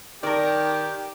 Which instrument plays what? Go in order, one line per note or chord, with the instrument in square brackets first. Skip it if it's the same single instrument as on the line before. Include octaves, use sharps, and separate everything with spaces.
[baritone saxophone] D#3 [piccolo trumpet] G4 [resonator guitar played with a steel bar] A#4 D5